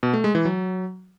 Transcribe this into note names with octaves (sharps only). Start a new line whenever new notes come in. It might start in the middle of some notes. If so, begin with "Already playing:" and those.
B2
A3
G#3
E3
F#3